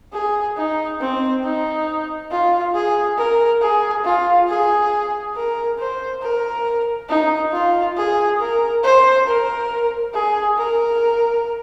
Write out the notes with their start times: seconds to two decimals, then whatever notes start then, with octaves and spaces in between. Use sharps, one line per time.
0.13 G#4
0.57 D#4
1.00 C4
1.44 D#4
2.31 F4
2.74 G#4
3.18 A#4
3.61 G#4
4.04 F4
4.48 G#4
5.35 A#4
5.79 C5
6.22 A#4
7.09 D#4
7.52 F4
7.97 G#4
8.40 A#4
8.83 C5
9.26 A#4
10.14 G#4
10.57 A#4